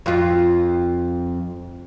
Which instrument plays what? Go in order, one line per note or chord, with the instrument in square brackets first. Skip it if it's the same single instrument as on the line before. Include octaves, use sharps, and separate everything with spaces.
[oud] F2 F4